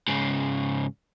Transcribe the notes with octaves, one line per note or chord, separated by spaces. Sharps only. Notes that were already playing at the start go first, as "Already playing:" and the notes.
G#2 C#3